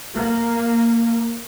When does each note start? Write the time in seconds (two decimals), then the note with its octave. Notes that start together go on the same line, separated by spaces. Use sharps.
0.14 A#3